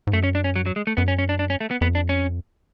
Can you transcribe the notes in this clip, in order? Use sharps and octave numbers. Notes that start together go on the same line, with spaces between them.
G#2
F#2 A3
C#4
D4
C#4
F#3
F#3
G#3
A3
F#2 B3
C#4
C#4
D4
D4
C#4
A3
B3
F2 B3
D4
C#4